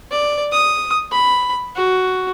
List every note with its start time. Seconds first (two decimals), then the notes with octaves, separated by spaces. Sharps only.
0.11 D5
0.52 D#6
1.11 B5
1.75 F#4